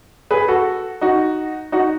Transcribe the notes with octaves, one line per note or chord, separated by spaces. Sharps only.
G#4 B4
F#4 A4
D#4 F#4
D#4 F#4